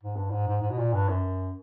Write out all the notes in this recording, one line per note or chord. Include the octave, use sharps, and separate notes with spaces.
G#2
G2
G#2
G#2
G#2
B2
A#2
G2
F#2